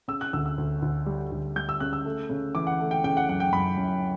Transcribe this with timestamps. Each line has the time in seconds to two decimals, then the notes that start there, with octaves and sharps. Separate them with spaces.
0.08 C#3 E6
0.21 F#6
0.33 D2 E6
0.46 E6
0.58 D2
0.82 D2
1.06 G3
1.32 D2
1.56 G3 G6
1.69 E6
1.80 C#3 F#6
1.93 E6
2.05 A3
2.30 C#3
2.55 E3 D6
2.67 F#5
2.80 A3
2.91 G5
3.04 C#3 G5
3.17 F#5
3.29 F#2 F#5
3.40 G5
3.53 F#2 B5
3.77 F#2